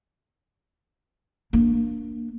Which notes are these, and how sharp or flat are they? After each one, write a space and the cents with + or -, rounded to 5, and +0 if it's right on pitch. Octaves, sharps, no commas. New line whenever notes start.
A#3 +0 D4 +0